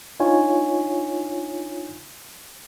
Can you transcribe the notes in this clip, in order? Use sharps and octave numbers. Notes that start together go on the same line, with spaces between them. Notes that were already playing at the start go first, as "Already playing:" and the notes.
D4 D#4 F4 C#5 G#5